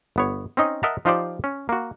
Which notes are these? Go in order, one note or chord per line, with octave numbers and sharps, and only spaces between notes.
G1 B3 C#5
C4 C#4 D#4 D#5
A#4 D#5 E5 F#5 A5 A#5
F3 D#4 F4 G4 C5 D5
C#4
A#3 F#4